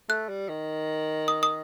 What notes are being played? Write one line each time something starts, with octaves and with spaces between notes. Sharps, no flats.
A3 F#6
G3
D#3
D#6
D#6